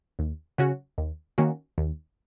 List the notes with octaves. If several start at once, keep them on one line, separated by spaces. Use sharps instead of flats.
D#2
C#3 F#3 C#4 F#4
D#2
D#3 A#3 C#4 F#4
D#2